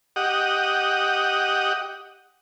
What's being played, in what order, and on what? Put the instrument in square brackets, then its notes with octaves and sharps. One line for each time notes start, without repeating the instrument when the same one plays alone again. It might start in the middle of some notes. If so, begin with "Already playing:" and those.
[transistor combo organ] G4 D#5 F#5